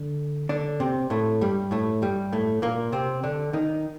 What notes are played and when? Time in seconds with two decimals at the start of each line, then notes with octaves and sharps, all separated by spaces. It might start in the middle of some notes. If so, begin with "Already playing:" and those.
Already playing: D3
0.49 D3 D4
0.80 C3 C4
1.10 A2 A3
1.41 G2 G3
1.71 A2 A3
2.02 G2 G3
2.32 A2 A3
2.62 A#2 A#3
2.92 C3 C4
3.23 D3 D4
3.53 D#3 D#4